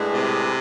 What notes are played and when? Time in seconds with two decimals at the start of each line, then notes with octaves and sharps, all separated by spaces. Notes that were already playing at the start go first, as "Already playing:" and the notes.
Already playing: A2 G#3 D4 G#4 B4
0.13 C3